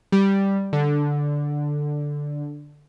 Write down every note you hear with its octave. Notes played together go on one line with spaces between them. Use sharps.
G3
D3